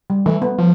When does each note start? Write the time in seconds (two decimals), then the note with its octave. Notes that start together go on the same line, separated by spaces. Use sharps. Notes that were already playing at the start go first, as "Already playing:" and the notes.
0.10 G3
0.26 E3 A3
0.42 B3
0.58 F3